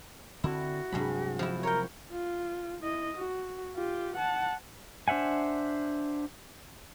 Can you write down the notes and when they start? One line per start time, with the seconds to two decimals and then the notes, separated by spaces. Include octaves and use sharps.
0.44 D3 C4 E4 F#4
0.92 G2 C3 F#3 G#3 G#4 B5
1.39 F3 E4
1.63 A#4 C#5 G5
2.12 F4
2.83 E4 D#5
3.16 F#4
3.76 F4 G4
4.16 F#5 A5
5.08 D4 C5 E5 F#5 G#5